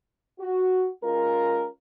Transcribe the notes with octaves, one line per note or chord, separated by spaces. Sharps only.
F#4
G#3 C#4 F4 A#4